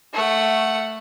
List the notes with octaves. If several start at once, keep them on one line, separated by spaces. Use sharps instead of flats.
A3 F#5